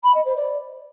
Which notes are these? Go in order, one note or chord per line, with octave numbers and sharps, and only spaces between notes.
B5
D#5
C5
D5